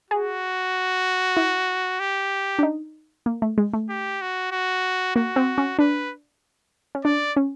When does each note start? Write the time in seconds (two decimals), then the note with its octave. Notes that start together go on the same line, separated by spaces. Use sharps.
0.11 F#4 G#4
1.37 E4
2.00 G4
2.59 D4
2.63 D#4
3.26 A#3
3.42 A3
3.58 G#3
3.73 A3
3.90 G4
4.21 F#4
4.52 F#4
5.15 A#3 F#4
5.36 C4
5.58 C#4
5.79 D4 B4
6.95 C#4
7.05 D4 D5
7.36 C#4